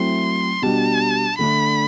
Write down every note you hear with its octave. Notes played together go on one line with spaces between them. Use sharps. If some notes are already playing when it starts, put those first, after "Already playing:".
Already playing: F#3 A3 C4 E4 C6
B2 G3 D4 F#4 A5
D3 A3 D4 B5